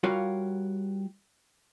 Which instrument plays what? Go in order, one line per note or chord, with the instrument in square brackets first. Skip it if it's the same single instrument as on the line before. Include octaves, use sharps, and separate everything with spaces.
[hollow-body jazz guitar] G3 F4 F#4 A#4 C#5 F5